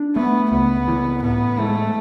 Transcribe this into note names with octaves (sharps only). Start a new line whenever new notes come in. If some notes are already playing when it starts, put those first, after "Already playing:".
Already playing: D4
A3 B3
C#2 B3
E3
A2 B3
G#3 A3